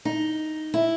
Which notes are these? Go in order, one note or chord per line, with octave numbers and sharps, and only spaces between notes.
D#4
E4